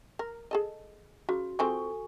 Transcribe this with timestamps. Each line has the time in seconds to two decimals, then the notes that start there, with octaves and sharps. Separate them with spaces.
0.19 A#4
0.51 G#4 A4 D#5
1.29 C#3 F#4
1.59 F3 C4 G#4 A4 G#5 C#6